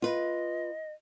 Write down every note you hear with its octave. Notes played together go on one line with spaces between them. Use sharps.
F4 B4 D#5